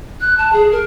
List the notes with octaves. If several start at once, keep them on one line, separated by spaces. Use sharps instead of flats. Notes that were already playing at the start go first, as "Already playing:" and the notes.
F#6
A5
G#4
A#4